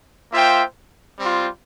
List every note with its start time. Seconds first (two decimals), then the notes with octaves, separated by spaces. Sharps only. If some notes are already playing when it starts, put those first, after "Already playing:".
0.33 A#3 F4 C5 E5 G5
1.17 G3 C4 F4